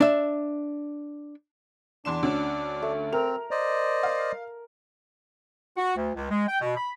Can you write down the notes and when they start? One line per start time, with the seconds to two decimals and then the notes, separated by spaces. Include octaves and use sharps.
0.01 D4 E5
2.05 E2 D4 C6 E7
2.23 D2 D3 C#4
2.82 A3
3.13 C4 A#4 F7
3.51 C5 D5 D#5
4.03 F5
5.77 F#4
5.96 D2
6.15 C#2
6.30 G#3
6.48 G5
6.61 B2
6.77 B5